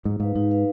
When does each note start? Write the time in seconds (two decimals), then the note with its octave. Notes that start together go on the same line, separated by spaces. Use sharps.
0.04 G#2 D#4
0.20 G#2 B4 F5
0.35 G#2 D#4
0.51 B4 F5